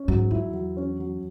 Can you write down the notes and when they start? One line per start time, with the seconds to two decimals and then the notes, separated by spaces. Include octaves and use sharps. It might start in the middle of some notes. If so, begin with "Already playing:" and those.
Already playing: C#4
0.08 G#2 F#3
0.31 E2 E4
0.53 F#3
0.77 C#4
0.99 F#3